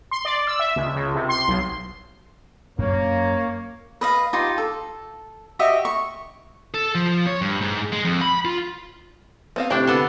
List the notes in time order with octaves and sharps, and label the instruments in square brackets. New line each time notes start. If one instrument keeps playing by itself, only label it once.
[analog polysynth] C6
D5
E6
E5
C#2
C#2
C3
C6
B1
[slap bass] F#2 [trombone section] A#3 [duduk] C#5
[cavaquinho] B4 D#5 F5
D#4 F4 G4
A4
F#4 G4 D#5 E5
C#6
[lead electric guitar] A4
F3
C#5
G2
G#2
G#3
F2
B5
F4
[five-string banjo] B3 C4 F5
[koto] C3 D4 [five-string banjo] A3 E4 G5
[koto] D3 B3 A4